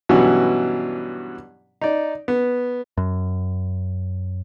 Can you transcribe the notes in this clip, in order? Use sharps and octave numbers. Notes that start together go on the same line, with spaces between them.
G2 B2 E3 F#3 G3 C#4
D#4 D5
B3
F#2